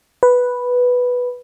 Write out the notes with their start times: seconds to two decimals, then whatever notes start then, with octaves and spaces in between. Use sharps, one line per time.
0.23 B4